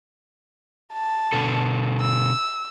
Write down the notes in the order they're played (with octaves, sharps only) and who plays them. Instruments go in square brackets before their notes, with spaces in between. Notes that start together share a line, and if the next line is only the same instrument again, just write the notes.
[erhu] A5
[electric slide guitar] B2 D3 A4
[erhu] E6